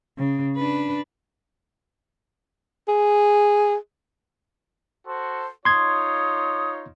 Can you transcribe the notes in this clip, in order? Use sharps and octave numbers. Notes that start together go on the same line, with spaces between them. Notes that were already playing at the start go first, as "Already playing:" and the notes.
C#3
D4 B4
G#4
F#4 A4 C5
D#4 F4 C#5 C6 D#6 G#6